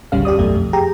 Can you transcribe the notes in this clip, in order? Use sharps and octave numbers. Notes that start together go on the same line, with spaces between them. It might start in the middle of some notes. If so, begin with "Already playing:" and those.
G#1 D2 C#3 G3 C#4 F5
E2 G4 D5 D#6
B1 F#2 B2 A3
F2
G4 G#4 G5 A#5